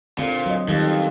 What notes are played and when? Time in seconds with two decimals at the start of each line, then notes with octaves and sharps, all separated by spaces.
0.19 A#2 D3 C4
0.46 F#3 D#5
0.68 F2 D#3 G3